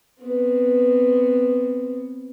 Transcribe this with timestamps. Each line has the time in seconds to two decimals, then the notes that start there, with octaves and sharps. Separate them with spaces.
0.22 B3 C4